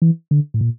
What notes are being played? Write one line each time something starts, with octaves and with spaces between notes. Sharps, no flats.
E3
D3
A2
A#2